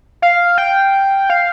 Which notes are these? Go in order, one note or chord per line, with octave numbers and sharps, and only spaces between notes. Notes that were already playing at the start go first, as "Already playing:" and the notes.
F5
G5
F5